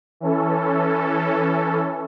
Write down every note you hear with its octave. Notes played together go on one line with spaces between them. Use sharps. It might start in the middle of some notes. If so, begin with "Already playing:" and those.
E3 C#4 A4